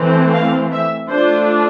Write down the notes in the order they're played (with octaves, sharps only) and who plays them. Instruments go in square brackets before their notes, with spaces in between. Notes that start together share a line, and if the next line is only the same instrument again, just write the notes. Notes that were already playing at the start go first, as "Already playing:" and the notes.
Already playing: [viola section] E3 A3 C4
F5
E5
A3 D4 F4 C5